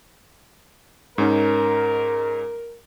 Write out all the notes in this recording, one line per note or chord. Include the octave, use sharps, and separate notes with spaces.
G#2 C#4 D#4 A#4